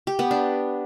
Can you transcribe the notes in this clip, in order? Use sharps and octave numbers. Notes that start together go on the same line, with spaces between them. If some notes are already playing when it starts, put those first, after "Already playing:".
G4
B3
D4